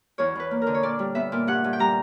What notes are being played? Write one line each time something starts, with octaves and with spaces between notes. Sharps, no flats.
E2 C#5
E2 B4
A#3
A#4
D3
C#5
A#2 D5
G3
B3 E5
A#2
G2 F#5
G2
G5
G3 A#5